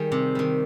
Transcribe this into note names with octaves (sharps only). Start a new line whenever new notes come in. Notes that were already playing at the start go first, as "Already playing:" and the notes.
Already playing: D#3 G3 G#4
C3
D#3 G3